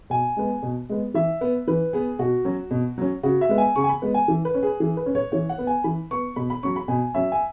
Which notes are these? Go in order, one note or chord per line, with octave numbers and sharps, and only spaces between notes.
B2 G#5
G#3 B3
B2
G#3 B3
E3 E5
B3
E3 B4
B3 G#4
B2 F#4
F#3 C#4
B2
F#3 C#4
C#3 F#4
E5
G#3 B3
G#5
C#3 C#6
G#5
B5
G#3 B3
G#5
E3
B4
C#4
G#4
E3 G#4
B4
C#4
C#5
E3 C#5
F#5
B3
G#5
E3 B5
B3 C#6
B2 B5
B5
F#3 C#4 C#6
B5
B2 G#5
F#3 C#4 E5
G#5